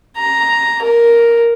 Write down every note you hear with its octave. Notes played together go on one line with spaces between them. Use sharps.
A#5
A#4